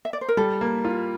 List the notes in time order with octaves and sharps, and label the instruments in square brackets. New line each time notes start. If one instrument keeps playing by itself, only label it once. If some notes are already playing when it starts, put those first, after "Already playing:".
[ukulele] E5
D5
C5
A#4
[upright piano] G3 [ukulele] A4
[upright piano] A#3
F4